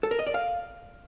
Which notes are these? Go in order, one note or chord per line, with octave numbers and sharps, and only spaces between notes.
A4
A#4
D#5
D5
F5